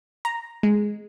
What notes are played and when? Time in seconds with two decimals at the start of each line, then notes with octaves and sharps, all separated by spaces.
0.25 A#5
0.63 G#3